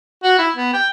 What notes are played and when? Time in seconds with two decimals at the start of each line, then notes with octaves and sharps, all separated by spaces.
0.24 F#4
0.39 E4
0.56 B3
0.73 G5